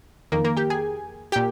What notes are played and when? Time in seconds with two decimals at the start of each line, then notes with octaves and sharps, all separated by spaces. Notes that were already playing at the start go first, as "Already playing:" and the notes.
0.32 F2 D#3 A#3 A#4
0.45 A#3 A#4
0.57 G4 G5
0.70 G#4 G#5
1.32 A#2 G4 G5